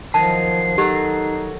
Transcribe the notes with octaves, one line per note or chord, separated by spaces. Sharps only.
D#3 F3 F#3 A5 C7
F#3 D#4 F#4 G4 A4